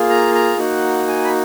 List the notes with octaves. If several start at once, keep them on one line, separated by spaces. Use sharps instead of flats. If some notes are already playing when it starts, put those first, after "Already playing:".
Already playing: A#3 F4 G#4
A#5
A#5
A#3 D#4 F#4 F#5
G#5
B5